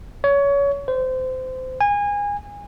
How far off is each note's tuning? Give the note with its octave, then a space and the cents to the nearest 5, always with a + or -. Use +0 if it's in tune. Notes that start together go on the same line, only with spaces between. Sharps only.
C#5 +25
C5 -25
G#5 -25